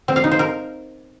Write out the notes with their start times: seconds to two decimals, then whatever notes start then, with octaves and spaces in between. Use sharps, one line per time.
0.08 C4
0.16 F5
0.24 D#4
0.31 C5
0.39 A#4